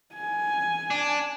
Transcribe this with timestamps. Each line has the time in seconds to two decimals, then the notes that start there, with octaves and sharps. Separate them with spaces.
0.15 G#5
0.90 D4